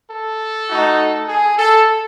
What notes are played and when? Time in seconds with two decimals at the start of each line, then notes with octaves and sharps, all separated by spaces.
0.09 A4
0.68 A3 D#4 F#4
1.29 G#4
1.58 A4